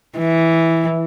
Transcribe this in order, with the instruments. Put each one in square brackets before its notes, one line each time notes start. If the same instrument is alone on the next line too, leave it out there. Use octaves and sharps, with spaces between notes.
[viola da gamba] E3